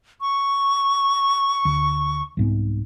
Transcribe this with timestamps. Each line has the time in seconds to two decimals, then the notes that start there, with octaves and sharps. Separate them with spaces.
0.21 C#6
1.65 D2
2.37 C2 G#2 B3